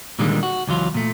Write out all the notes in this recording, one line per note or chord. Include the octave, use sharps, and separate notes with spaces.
A#2 D3 D#3 G3 G#3 A#3
F#4
C#2 E3 F#3 F4
A#2 A3